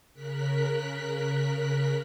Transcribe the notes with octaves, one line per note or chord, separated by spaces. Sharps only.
C#3 A#4 F#6 B6